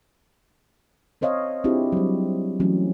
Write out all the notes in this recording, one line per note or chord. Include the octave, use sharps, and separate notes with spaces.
C4 C5 C#5 D#5 F5
C4 D4 E4 F4 G4 G#4
F#3 G3
E3 F#3 A3 C#4